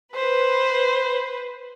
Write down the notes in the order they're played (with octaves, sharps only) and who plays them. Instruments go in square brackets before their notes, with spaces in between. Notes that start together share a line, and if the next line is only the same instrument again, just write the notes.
[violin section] B4 [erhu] C5